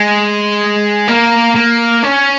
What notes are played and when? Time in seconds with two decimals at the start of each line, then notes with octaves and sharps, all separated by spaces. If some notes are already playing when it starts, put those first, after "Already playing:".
Already playing: G#3
1.08 A#3
1.56 A#3
2.04 C#4